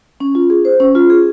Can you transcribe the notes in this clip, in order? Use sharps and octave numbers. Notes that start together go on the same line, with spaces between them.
C#4
F4
G#4
C5
C#4
F4
G#4